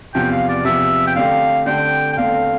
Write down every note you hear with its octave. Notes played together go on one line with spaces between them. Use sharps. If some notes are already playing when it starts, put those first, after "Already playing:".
E2 C3 F3 G5
F5
D5
E2 C3 F3 E5
G5
D3 A3 C4 G4 F5
D3 A3 C4 G4 G5
G5
E2 D3 A3 C4 F5